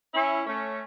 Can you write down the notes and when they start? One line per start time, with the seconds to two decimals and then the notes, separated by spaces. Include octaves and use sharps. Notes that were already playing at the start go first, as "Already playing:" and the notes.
0.14 C#4 E4
0.47 A3 C#4